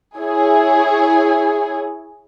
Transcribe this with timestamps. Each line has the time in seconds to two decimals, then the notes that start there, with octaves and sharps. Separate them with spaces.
0.16 E4 G#4 C#5